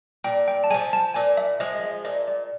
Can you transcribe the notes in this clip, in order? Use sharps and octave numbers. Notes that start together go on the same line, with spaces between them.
A#2 G5
G5
A5
F3 G#3 G#5
A5
A#2 G#5
E5
F3 G#3 D#5
D#5
E5
A#2 D#5
D5